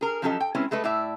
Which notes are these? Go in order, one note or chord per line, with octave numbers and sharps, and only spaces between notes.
G#4 A#4
F3 F#3 C#4 G4 A4 D#5
G5
G#3 C4 C#4 E4 B4 C#5
G#3 A3 A4 B4
A2 D5 E5